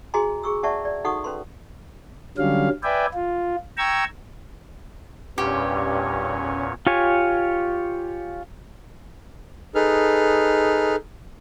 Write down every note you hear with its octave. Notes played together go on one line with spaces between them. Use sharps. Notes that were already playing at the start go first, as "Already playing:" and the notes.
F#4 G#4 D#5 G#5 A#5 C6
G#4 C#6 E6
C#4 D5 E5 F#5 A5 C#6
D5
D#4 F#4 A4 F#5 C#6 D#6
C#4 B4 C6
D3 F#3 G3 C#4 F5
B4 D5 E5 G5 G#5
F4
G5 A#5 C#6 E6 G#6
E2 G2 A#2 C#4 G4 C#5
F4 G4 C#5 G#5
D#4 G#4 A4 B4 F6